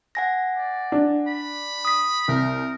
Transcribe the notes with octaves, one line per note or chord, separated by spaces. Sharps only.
F#5 G#5 A#6
D5
D4
B5
D#6 B6
C2 A#4